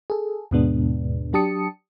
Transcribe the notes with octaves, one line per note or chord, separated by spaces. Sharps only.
G#4 A4
D#2 G#2 B2 G#3 B3 D4
F#3 D4 G4 A5 D#6 C#7